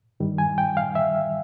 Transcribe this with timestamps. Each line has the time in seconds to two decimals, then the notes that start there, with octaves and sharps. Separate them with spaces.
0.20 G2 D#3 G3
0.38 G#5
0.58 G5
0.77 F5
0.95 E5